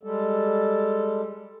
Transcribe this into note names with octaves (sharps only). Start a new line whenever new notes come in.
G3 G#3 A4